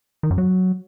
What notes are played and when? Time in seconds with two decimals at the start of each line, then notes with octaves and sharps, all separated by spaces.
0.23 D#3
0.31 F#2
0.38 F#3